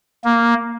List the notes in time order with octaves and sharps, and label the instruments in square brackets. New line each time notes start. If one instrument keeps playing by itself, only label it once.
[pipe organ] A#3